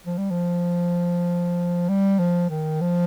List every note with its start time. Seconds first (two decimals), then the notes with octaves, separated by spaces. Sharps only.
0.06 F3
0.18 G3
0.30 F3
1.89 G3
2.19 F3
2.50 D#3
2.81 F3